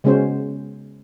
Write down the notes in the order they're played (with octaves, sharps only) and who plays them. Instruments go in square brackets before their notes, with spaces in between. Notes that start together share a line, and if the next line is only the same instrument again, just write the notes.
[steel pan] C#3 G#3 B3 C#4 F#4 C5